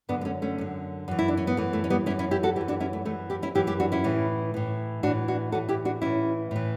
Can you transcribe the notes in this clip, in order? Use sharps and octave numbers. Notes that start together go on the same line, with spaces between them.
F#2 D3 B3 D4
B3
A3 C#4
A3 C#4
F#2 D3
F#2 E3
E4
D4
C#4
B3
F#2 E3 A3
A3
C#4
G3 B3
F#2 E3 C#4 E4
C#4 E4
E4 G4
F#4 A4
F#2 E3 E4 G4
D4 F#4
C#4 E4
A3
F#2 E3 A3
E4 G4
C#4 E4
F#2 E3 E4 G4
E4 G4
D4 F#4
C#4 E4
A2 E3
A2 E3
A2 E3 D4 F#4
D4 F#4
A2 E3 F#4 A4
E4 G4
D4 F#4
A2 E3 C#4 E4
A2 E3